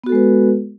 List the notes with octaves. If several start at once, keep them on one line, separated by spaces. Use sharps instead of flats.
G#3 B3 F#4 A4 B4